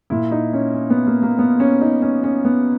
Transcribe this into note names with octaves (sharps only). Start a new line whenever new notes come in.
A#2 E4
D#4
C#4
C#4
B3
A#3
A#3
B3
C#4
D#4
C#4
C#4
B3